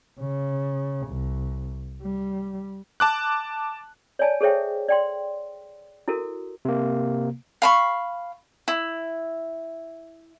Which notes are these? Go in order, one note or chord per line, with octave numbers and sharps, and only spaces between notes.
C#3
C2
G3
A5 D6 F#6
C#5 D5 G#5 A5
G#4 A4 C5 C#5 E5 G5
D5 G5 C6
E4 F#4 A4 A#4
C3 A#3
F5 B5 C#6
E4